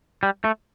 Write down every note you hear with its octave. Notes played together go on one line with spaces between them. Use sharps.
G3
A3